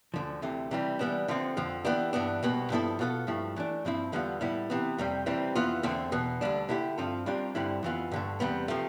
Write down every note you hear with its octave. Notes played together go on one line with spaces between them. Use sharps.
D2 D3 F3
D2 C3 E3 A3
C3 E3 G3
E3 G3 B3 D4
D3 F3 A3 C4
F2 D3 F3
E3 B3 D4 G4
G2 E3 B3 D4
C2 B2 B3
G2 F3 B3 E4 A4
B2 B3 F4 A4
G2 F3 A3 E4
E3 A3 D4
G2 F3 C4 E4
E2 D3 G3 B3 F4
A2 G3 B3 E4
C3 E3 B3
F2 C3 G3
C3 E3 G3 C4
F2 E3 B3 F4
E2 D3 A3 C4
E2 B2 B3
D2 D3 G3 D4
D3 A3 E4 G4
G2 F3 C4 F4 A4
C2 C3 G3 D4 F4
G2 D3 G3 C4 E4
F2 E3 B3 F4
G2 D3 A3
E2 C3 G3 B3
C3 F3 A3